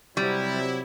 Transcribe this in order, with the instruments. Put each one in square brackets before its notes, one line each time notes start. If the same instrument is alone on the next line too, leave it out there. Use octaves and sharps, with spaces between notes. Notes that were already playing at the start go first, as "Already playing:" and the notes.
[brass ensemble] C3 F#3 E4 [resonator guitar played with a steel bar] G3